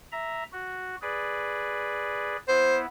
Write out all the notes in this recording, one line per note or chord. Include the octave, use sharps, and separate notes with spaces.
E5 A#5
F#4
G#4 B4 D5
B3 E4 C5